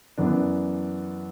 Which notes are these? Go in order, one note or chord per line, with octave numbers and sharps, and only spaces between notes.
F#2 E3 B3 D4